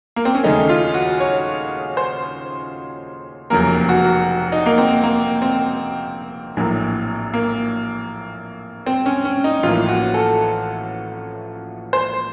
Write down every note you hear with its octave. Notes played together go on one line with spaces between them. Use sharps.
A#3
C4
C#4
D#2 C#3 A3 D#4
F4
F#4
C#5
C5
F1 F2 C#3 F#3 A#3 A#4
F#4
D#4
A#3
C4
A#3
C4
A#1 A2 F#3 A#3
A#3
C4
C#4
C#4
D#4
A1 A2 F3 A#3 F4
F#4
A4
C5